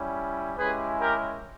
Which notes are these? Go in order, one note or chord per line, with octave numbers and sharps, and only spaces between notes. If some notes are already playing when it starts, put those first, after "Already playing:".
Already playing: G3 C#4 E4
G#3 C#4 E4 G4 G#4 B4
G4 A#4